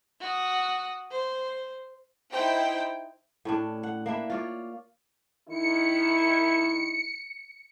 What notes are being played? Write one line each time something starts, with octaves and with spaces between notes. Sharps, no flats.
F#4 D#6
C5
D#4 E4 C5 G5
A2 C#4 D4
F#5
A#3 D4 E4
F4 C#5 D5
D#3 E4 C#7